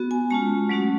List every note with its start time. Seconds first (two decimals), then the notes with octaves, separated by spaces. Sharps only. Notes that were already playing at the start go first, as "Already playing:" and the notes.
Already playing: B3 F#4
0.11 G#5
0.30 G#3 C#4 F4 A5
0.69 F#3 A3 C#4 F#4